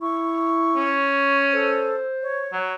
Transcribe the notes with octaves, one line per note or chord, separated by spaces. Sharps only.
E4 C#6
C#4
A4 C5
C#5
F#3